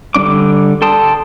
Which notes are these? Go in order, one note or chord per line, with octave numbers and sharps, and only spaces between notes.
D3 G3 C4 D4 D6
A4 G5 A5 C6 D#6